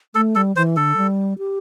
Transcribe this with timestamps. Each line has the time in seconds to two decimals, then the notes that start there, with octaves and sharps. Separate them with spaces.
0.15 A3 A4
0.35 G3 A4
0.56 E3 C5
0.76 D3 A4
0.97 G3
1.38 G4